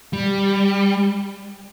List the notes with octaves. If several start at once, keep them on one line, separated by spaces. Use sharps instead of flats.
G3